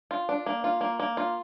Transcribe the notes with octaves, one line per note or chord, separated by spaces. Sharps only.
F4
D4
A#3
F4
A#3
A#3
F4